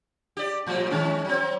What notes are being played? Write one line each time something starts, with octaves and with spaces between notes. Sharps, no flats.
G4 D5
A2 F3 G3
D#3 G#3 C#4
F#3 C4